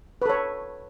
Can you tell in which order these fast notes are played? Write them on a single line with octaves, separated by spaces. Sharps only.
B4 A4 C#5